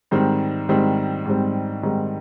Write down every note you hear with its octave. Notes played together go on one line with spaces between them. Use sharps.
G#2 D#3 G3 C4
G#2 D#3 G3 C4
G#2 D#3 G3 C4
G#2 D#3 G3 C4